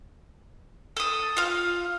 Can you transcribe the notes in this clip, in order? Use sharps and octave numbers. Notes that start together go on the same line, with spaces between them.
A4 D#6
F4 F5